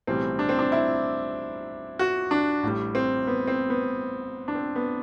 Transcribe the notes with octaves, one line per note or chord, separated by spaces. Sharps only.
B1 A2 E3 G3 C4
D4
C4
D4
E4
F#4
D4
A1 A2 G3
C4
B3
C4
B3
D4
C4
B3